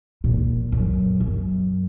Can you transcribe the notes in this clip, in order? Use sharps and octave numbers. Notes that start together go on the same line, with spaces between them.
A#2
F#2
F#2